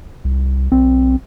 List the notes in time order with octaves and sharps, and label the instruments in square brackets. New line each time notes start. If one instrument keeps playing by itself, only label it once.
[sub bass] C2
[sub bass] B1 [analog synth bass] C4